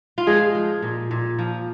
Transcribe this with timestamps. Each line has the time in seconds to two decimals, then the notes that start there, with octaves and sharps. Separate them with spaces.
0.18 F4
0.27 F3 G#3 G#4
0.55 F3
0.82 A#2
1.11 A#2
1.39 F3